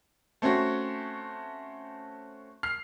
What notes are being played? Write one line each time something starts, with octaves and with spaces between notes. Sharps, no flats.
A3 C4 C#4 F#4
F6 C7